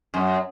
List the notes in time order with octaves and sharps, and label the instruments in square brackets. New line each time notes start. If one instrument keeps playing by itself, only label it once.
[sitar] F#2